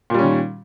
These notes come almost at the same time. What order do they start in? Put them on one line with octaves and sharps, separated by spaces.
A#2 G3 C#4 D#3